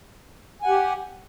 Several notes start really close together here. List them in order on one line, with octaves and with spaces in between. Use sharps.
G#5 F#5 G4